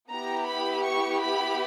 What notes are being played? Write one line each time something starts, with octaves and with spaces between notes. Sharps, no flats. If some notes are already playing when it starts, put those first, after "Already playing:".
B3 E4 G4 A#5
B5
C#6
B5